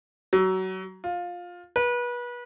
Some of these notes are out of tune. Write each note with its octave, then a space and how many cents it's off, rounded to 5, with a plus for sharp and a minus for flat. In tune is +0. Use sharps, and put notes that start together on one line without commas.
F#3 +25
F4 +15
B4 -30